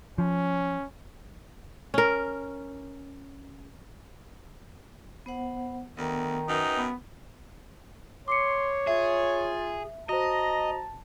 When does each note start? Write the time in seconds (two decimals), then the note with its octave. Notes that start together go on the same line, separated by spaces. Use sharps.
0.18 F3 C#4
1.94 C#4 A#4
5.26 B3 C5 F#5
5.98 D2 D#3 B3
6.49 F#2 D#4 B4 G5
6.77 B3
8.28 C#5 C6 D6 C7 C#7
8.87 F4 G#4 E5
10.09 F#4 C5 D#5 A5 A#5